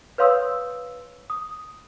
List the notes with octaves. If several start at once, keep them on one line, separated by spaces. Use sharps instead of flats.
B4 C#5 F5 C6 D#6 E6
D#6